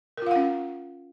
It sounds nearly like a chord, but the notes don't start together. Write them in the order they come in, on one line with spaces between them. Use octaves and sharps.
A#4 F4 F5 F#5 C#4